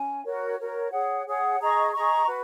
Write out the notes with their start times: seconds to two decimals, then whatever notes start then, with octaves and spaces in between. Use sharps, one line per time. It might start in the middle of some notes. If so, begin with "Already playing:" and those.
Already playing: C#4 G#5
0.25 F#4 A#4 C#5
0.58 F#4 A#4 C#5
0.92 G#4 C#5 F#5
1.26 G#4 C#5 F#5
1.60 G#4 D#5 A#5 C#6
1.93 G#4 D#5 A#5 C#6
2.26 F#4 B4